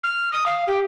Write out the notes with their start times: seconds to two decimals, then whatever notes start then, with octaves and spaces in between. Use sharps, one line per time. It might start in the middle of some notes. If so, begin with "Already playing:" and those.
0.03 F6
0.32 D#6
0.46 F5
0.67 G4